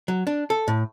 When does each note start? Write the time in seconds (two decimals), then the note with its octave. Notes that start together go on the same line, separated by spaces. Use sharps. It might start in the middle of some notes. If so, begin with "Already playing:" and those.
0.08 F#3
0.27 D4
0.50 A4
0.68 A2